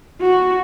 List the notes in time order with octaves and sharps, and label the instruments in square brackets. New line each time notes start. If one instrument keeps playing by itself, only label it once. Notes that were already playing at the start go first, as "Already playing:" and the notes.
[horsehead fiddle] F#4